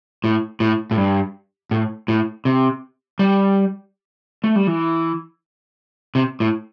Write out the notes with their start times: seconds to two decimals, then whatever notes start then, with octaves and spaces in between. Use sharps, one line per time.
0.24 A2
0.60 A2
0.91 A2
0.97 G2
1.71 A2
2.08 A2
2.45 C3
3.19 G3
4.44 A3
4.56 G3
4.67 E3
6.15 C3
6.40 A2